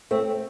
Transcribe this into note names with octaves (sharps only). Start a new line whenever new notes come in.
A3 C4